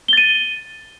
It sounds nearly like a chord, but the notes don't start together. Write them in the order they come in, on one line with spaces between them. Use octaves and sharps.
G7 A6 D#7